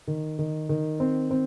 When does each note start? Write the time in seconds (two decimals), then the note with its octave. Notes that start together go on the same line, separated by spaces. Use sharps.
0.08 D#3
0.39 D#3
0.69 D#3
1.00 C4
1.31 C4